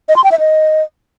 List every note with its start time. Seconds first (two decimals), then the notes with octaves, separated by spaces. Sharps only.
0.09 D#5
0.16 C6
0.24 G5
0.32 E5
0.39 D#5